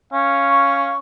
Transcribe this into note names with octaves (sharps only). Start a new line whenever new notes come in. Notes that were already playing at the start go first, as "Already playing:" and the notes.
C#4 F5
C#6